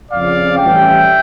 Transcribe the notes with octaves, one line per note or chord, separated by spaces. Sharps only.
F2 C#3 F3 D5 F5
A1 A2 E3 G3 C#4 E5 G5